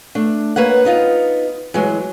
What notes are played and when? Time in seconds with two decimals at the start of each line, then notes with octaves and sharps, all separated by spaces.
0.15 A3 D4
0.56 A#3 B4 C#5 F#5
0.85 B3 D#4 F4
1.74 E3 F#3 G#3